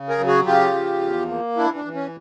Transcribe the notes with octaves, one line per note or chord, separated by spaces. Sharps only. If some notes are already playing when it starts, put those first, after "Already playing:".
Already playing: C#3
G#4 A#4
F#3
F#4 G#4
C#3 F4 G4
F3
E2
A#3
E3 D4 E4
D4
E3
C#4